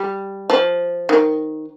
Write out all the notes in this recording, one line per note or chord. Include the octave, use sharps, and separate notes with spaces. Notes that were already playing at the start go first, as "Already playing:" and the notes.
Already playing: G3
F3
D#3